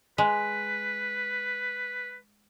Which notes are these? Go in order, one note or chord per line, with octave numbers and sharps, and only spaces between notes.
G#3 B4